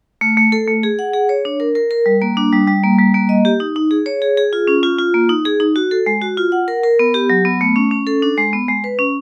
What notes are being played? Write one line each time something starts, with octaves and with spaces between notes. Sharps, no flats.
A3
A3
A4
A3
G#4
F#5
G#4
C#5
D4
A#4
A#4
A#4
G3
A#3
D4
G3
G3
A#3
G3
A#3
D#5
G4
D#4
D#4
G#4
C#5
G#4
G#4
F4
C#4
F4
F4
A#3
D#4
G#4
D#4
F#4
A4
G#3
F#4
F4
F#5
A#4
A#4
B3
G4
F#3
B3
A3
C#4
C#4
A4
D4
G#3
B3
G#3
B4
C#4